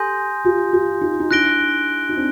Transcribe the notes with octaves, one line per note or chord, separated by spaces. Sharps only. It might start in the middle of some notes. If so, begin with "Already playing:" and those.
Already playing: G4 A4 G#5 C6 D#6 G6 A#6
F4 G4
F4 G4
D#4 F4
D#4
D4 E4 F#6 A#6 D7 G7
D#4
C4 D4